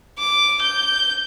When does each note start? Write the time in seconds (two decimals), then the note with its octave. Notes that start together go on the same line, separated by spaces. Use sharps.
0.18 D6
0.62 G6